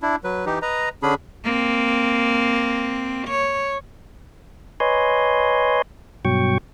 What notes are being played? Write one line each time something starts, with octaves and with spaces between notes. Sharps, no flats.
D4 E4
F#3 B4
E3 D#4 G4
B4 D#5 A#5
D3 C#4 D4 G#4 B5
A#3 C4
C#5
B4 C#5 D#5 G#5 C6
G2 B2 F#3 G5 C#6